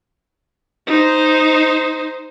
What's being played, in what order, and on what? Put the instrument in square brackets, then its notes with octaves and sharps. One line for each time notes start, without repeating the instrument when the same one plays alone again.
[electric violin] D#4 C5